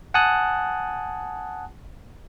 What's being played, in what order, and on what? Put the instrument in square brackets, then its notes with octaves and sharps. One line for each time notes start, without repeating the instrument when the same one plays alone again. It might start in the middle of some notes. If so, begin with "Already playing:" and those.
[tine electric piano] F#5 G#5 A5 D#6 F#6